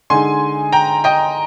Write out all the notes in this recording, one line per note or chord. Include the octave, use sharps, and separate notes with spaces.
D3 G#3 D#4 G#5 C6
G5 A#5
D#5 G5